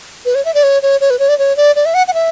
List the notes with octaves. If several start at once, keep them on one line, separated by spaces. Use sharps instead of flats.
B4
C#5
E5
D5
C#5
C#5
C#5
B4
C#5
D5
C#5
D5
D5
E5
F#5
F#5
E5